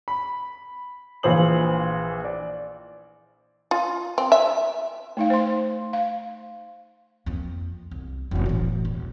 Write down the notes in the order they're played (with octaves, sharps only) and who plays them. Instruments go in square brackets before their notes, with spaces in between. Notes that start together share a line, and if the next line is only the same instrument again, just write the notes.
[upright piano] B5
A#1 E3 F4 C5 D#6 F#7
D5
[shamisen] F4
C4
E5
[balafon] A3 D#4 F5
C5 C6
F5
[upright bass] F2 A#3
C2
E1 B3
A2 E3
E1